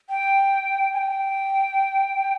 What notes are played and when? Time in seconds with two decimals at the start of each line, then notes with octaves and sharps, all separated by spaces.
0.09 G5
0.94 G#5
0.98 G5